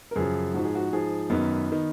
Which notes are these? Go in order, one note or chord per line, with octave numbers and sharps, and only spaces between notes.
A#4
F#2 C#3 F3 G#4
G#2 F3 F#4
G#4
F#4
G#2 F3 G#4
F#2 D#3 B3
D#3